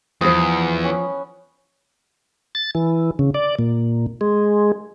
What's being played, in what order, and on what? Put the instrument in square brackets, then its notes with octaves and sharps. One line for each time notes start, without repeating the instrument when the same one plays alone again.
[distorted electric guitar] E2 [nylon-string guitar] F3 C5 [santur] B3 D#6
[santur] C#4
[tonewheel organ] A6
E3
C#3
D5
A#2
G#3